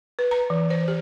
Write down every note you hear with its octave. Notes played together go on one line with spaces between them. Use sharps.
B4
A#5
E3
C5
G4